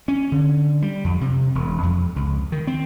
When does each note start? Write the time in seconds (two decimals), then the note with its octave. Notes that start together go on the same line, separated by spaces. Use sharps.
0.08 C#4
0.32 D3
0.82 G3
1.04 F2
1.21 C3
1.55 E1
1.83 F2
2.16 C#2
2.52 D#3
2.67 C4